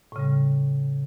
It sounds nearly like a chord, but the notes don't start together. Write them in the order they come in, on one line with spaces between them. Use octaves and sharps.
A2 C#3 G3